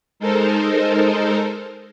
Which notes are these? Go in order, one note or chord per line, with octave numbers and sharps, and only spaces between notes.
G#3 D#4 A4 A#4 C5